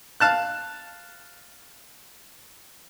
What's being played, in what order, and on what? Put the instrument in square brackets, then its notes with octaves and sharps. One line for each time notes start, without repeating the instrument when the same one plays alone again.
[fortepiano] F5 A5 F#6